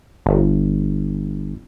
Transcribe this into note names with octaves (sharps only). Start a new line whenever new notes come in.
G1